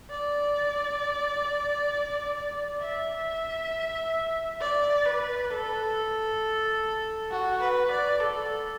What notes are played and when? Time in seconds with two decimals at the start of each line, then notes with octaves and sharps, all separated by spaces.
0.10 D5
2.81 E5
4.61 D5
5.05 B4
5.50 A4
7.30 F#4
7.60 B4
7.90 D5
8.20 A4